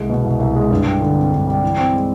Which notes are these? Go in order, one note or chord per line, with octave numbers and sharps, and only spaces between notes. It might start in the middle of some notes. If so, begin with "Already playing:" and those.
Already playing: C2 G#3
B2
C2
C2
G#3
G2
G3
D3
C4
G2
G3
E3
C4
G#3